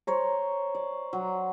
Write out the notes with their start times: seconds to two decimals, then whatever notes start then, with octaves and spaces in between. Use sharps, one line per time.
0.07 C5 C#5 A#5
0.75 D5
1.13 F#3